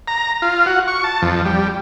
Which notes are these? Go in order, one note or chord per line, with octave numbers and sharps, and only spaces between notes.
A#5
F4
F#4
C#6
A5
F2
G3